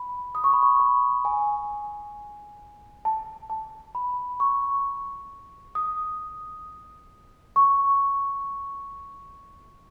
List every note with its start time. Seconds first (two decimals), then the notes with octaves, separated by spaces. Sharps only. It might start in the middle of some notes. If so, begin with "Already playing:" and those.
Already playing: B5
0.35 D#6
0.44 C#6
0.53 B5
0.63 C#6
0.80 B5
1.25 G#5
3.05 A5
3.50 A5
3.95 B5
4.40 C#6
5.75 D#6
7.56 C#6